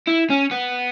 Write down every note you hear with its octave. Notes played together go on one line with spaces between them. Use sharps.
E4
C#4
B3